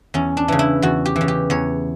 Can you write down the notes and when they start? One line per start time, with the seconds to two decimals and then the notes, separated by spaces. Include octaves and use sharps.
0.14 E2 C#4
0.37 D4
0.48 C#3 E3
0.59 E4
0.82 E2 F#4
1.05 G4
1.16 E3
1.21 C#3
1.28 G4
1.50 E2 C#5